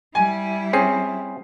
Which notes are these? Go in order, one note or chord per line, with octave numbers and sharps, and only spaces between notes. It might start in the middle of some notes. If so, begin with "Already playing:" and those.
G3 E4 G#5
C4 C#4 G#4 C7